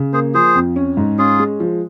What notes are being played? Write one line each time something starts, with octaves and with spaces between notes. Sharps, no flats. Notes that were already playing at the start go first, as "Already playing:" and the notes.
Already playing: C#3
A#3 G#4 C5
F3 G#4 C5
F2
C#4
G#2
C#4 F4 G#4
G#3
F3